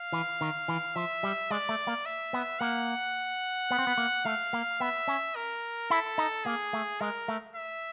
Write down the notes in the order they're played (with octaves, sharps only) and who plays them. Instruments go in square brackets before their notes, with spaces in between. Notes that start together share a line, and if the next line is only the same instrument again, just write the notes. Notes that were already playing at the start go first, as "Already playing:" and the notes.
Already playing: [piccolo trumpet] F5
[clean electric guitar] E3
D#3
E3
[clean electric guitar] F3 [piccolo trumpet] E5
[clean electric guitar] G3
[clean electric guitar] G#3 [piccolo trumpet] D5
[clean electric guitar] A3
A#3
[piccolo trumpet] E5
[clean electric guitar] B3
[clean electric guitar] A#3 [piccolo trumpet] F#5
[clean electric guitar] B3
C4
B3
A#3
[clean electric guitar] A3 [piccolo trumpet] F5
[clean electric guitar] A#3
[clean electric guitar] B3 [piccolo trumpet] E5
[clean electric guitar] C#4
[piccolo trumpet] A#4
[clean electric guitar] E4 [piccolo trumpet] A4
[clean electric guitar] D#4
[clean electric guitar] A#3 [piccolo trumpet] G#4
[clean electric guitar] A3
[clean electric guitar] G#3 [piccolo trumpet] A#4
[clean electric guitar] A3
[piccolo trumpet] E5